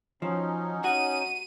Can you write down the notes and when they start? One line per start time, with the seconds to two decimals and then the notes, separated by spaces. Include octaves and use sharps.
0.22 F3 F#3 C#4 D#4
0.84 F#4 D#7